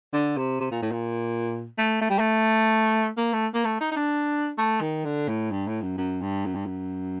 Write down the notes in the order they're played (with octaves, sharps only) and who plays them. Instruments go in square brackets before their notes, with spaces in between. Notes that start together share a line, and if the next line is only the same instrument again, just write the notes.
[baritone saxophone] D3
C3
C3
A#2
A2
A#2
A3
A3
G3
A3
A#3
A3
A#3
A3
D#4
D#4
D4
A3
D#3
D3
A2
G2
A2
F#2
F#2
G2
F#2
G2
F#2